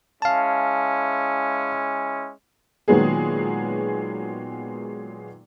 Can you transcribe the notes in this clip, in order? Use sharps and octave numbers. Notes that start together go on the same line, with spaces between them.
G#3 C#4 E4 F5 A5
A#2 D#3 F#3 G#3 B3 G#4